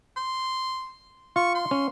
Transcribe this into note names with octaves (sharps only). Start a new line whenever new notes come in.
C6
F4 C#6
C6
C#4